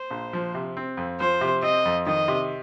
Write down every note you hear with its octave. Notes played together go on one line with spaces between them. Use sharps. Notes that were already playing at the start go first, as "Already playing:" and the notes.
Already playing: C5
A#1
F3
C3
C4
F2
F3 C5
C3
C4 D#5
F2
D#3 D#5
C3